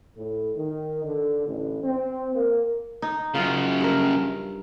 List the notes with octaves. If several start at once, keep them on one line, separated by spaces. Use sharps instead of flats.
A2
D#3
D3
A1
C4
A#3
D#4
F#2 C#3 F4
G2 A#4